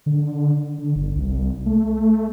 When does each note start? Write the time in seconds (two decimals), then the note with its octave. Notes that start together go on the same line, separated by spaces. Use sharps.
0.06 D3
0.78 D3
0.96 G1
1.16 C2
1.66 A3